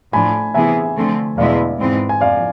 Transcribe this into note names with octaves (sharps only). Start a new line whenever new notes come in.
A2 F3 A3 D4 G#5 B5
C3 E3 B3 E4 G#4 E5 G#5
D3 F3 A3 C4
E2 B2 G#3 B3 E4 D5 F5
G#2 E3 G#3 C4
G#5
F2 D5 F5